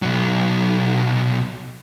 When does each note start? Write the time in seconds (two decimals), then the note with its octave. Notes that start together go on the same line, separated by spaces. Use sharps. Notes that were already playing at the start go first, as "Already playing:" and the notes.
0.02 B1 F#3